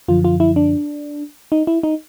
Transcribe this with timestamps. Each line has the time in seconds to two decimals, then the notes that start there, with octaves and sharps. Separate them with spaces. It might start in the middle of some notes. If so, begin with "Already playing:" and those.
0.08 F#2 D3 F3 F4
0.24 F4
0.40 E4
0.56 D4
1.52 D#4
1.67 E4
1.83 D#4